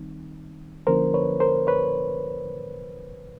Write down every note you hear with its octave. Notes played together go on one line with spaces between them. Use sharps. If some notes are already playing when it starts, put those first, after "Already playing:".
Already playing: D#3 G3 C4 D#4
D3 F3 A#3 C#4 E4 A#4 C5
B4 C#5
A#4 C5
B4 C#5